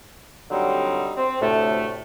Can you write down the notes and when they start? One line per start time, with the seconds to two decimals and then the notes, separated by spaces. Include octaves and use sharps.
0.50 D3 F#3 G3 C4 D#4
1.16 C4
1.41 D2 A2 C3 A3